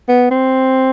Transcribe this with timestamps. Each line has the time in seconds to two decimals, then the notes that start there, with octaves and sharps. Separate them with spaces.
0.09 B3
0.31 C4